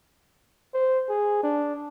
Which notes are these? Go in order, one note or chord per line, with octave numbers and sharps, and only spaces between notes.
C5
G#4
D4